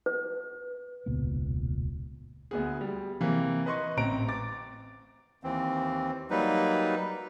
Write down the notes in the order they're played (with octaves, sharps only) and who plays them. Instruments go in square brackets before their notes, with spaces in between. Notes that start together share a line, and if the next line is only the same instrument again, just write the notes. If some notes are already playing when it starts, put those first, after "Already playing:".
[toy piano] B4
[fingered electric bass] E1 C#2 A#2 B3
[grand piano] D2 B3 G#4
G3
C3 E3 A#3
B4 D#5 C6 C#6
A1 C4 A#5 D7
D6 A6
[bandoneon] D#2 E3 C4
F#3 G3 A#3 D#4 B4